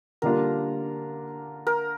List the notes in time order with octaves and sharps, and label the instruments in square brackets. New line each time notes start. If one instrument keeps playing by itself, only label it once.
[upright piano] D3 G3 A#3 D4 F4 [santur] A#4
[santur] A#4